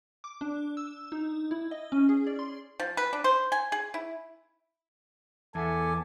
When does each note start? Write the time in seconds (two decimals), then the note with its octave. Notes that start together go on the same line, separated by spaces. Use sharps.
0.24 D6
0.41 D4
0.77 E6
1.12 D#4
1.51 E4
1.71 D#5
1.92 C#4
2.09 G#4
2.27 D5
2.39 C6
2.80 F3
2.97 B4
3.13 D4
3.24 C5
3.52 G#5
3.72 G#4
3.94 E4
5.55 E2 A4 E5 F#5 G#5 D6